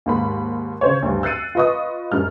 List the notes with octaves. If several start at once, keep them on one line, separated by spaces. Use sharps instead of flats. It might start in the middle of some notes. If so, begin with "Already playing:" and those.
D#2 G#2 B5
C#3 C5 C#5
D2 G2
E6 F#6 A6 C7 C#7 D#7
F4 B4 D#5 C#6 D#6
F#2 G3 F6